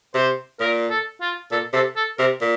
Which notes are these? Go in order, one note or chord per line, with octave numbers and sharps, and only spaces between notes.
C3 C5
A#2 A#4
A4
F4
A#2 A4
C3 A4
A4
C3 A#4
A#2